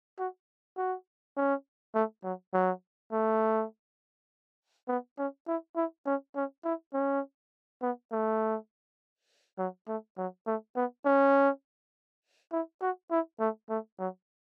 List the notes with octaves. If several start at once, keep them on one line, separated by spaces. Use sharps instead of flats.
F#4
F#4
C#4
A3
F#3
F#3
A3
B3
C#4
E4
E4
C#4
C#4
E4
C#4
B3
A3
F#3
A3
F#3
A3
B3
C#4
E4
F#4
E4
A3
A3
F#3